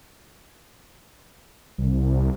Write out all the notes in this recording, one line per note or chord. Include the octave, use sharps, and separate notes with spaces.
C2